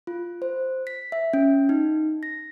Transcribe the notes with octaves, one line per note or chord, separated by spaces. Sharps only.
F4
C5
B6
E5
C#4
D#4
A#6